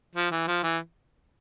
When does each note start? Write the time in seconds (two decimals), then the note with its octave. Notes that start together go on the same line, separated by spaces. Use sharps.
0.16 F3
0.32 E3
0.48 F3
0.63 E3